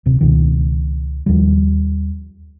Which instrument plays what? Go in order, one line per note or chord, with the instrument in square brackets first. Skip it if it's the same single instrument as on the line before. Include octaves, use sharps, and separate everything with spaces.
[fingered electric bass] D1 C3
C#2 B2 D#3
D#2 F3 G3